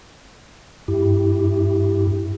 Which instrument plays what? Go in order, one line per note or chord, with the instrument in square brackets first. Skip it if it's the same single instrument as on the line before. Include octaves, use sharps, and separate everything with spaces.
[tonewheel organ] G2 E4 G4